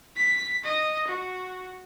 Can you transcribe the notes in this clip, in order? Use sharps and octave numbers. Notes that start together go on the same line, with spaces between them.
B6
D#5
F#4